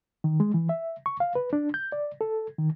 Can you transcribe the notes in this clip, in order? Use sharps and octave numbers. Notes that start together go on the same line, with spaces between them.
D#3
G#3
E3
E5
C#6
F5
B4
D4
G6
D5
A4
D#3